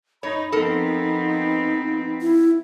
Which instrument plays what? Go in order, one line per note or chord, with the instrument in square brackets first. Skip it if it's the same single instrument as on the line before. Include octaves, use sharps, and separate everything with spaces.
[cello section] D#4 [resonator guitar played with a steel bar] C#5 [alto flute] B5
[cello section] F3 B3 C4 [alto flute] D#4 [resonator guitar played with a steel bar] A4 A#4
[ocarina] E4